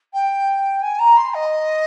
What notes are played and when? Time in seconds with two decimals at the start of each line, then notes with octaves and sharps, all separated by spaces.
0.13 G5
0.82 G#5
0.99 A#5
1.17 C6
1.34 D#5